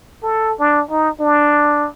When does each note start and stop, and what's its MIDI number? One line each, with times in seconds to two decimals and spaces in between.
0.23 0.54 69
0.59 0.83 62
0.91 1.10 63
1.20 1.88 62